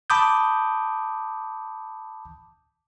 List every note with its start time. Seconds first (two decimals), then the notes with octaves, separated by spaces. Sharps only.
0.10 A5 B5 D6 D#6 G6